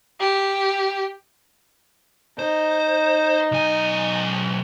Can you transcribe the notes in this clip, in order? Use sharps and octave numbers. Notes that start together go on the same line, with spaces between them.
G4
D#4 C5
B1 G#5